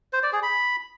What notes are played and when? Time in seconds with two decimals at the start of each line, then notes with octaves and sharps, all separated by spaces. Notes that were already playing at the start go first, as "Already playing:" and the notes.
0.13 C5
0.23 D5
0.33 G#4
0.43 B5